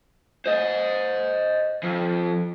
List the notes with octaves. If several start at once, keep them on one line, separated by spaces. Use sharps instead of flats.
C5 D#5
F2